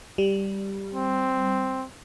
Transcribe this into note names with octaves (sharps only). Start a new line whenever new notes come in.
G3
C4